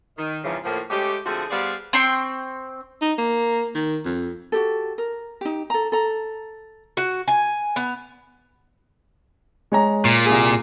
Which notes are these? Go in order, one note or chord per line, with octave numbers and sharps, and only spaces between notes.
D#3
F2 G#2 C#3 E3 F3
A2 F3 A#3
G#3 A3 C#4 G4
D3 F3 A3 C4 F#4 G#4
G3 B3 G#4 C5 D5 F5
C4 G5 C6 C#6
D#4
A#3
D#3
F2
F#4 G4 A4
A#4
D#4 G4
A4 A#5
A4 A#5
F#4
G#5
B3
G#3 C#5 A#5
A#2
C2 G#4